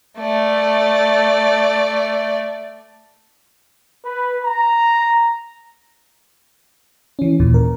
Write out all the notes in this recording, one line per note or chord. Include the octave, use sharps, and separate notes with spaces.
A3 D5
B4
A#5
E3 C#4
D#2 A#2
A#4